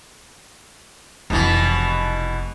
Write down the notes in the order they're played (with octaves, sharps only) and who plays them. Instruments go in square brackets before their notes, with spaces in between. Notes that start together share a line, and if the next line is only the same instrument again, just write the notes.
[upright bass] F1 E4 [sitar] B2 E3